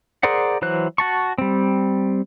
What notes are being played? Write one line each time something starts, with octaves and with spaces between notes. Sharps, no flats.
G#4 A#4 C5 D5 F#5
E3 F#3 C5 F#6
F#4 A5 C#6
G3 C4